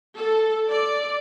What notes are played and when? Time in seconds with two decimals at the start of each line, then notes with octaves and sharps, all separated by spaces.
0.15 A4
0.68 D5